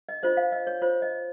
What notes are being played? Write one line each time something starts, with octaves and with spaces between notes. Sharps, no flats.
D#5
F4 C5 D#5
F5
D#5
C#5
F4 C5 C#5
D#5